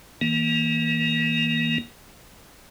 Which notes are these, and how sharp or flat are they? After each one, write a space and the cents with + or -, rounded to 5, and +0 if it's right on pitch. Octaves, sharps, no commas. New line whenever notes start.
E3 -40 A#3 +5